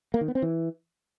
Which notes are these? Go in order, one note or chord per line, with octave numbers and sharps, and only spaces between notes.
A#3
D#3
B3
C4
E3